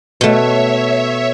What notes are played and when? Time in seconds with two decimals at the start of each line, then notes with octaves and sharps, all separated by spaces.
0.21 B2 A3 C#5 E5